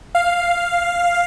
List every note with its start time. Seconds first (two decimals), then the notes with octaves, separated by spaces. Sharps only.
0.15 F5